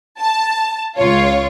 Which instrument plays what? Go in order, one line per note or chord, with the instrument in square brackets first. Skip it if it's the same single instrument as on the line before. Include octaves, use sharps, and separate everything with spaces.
[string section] A5
C#2 F4 C#5